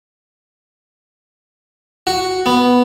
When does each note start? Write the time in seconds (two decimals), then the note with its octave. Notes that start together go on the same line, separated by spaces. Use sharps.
2.07 F#4
2.46 B3